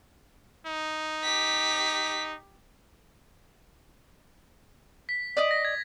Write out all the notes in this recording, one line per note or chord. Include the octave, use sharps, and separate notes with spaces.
D#4
G4 B6
B6
D5 D#5
A#6
G#6